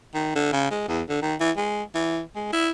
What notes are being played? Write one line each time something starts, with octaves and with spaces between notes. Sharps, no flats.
D#3
D3
C#3
G#3
E2
D3
D#3
E3
G#3
E3
G#3
E4